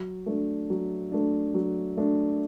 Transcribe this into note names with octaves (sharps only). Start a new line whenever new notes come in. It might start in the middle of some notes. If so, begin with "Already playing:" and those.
Already playing: F#3
A3 D4
F#3
A3 D4
F#3
A3 D4